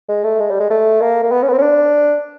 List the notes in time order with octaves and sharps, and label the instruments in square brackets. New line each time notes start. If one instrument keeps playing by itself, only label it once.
[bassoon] G#3
A3
G#3
G3
G#3
A3
A#3
A#3
B3
C#4
B3
C4
C#4
D4